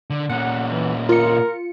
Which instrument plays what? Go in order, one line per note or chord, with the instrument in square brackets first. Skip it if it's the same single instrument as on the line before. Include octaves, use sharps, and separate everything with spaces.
[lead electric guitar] D3
[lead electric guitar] A#2 C#4 [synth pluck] F#5
[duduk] E3
[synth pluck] F4 C#7 [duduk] A#4